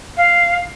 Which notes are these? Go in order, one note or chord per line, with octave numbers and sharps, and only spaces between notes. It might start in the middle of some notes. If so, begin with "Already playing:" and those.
F5